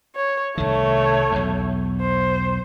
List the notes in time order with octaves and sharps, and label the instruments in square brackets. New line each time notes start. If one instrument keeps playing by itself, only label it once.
[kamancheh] C#5
[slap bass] C2 D#3 [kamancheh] A3 C#5
[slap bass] B1 E2
[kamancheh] C5